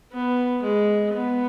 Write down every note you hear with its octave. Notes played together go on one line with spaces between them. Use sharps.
B3
G#3
B3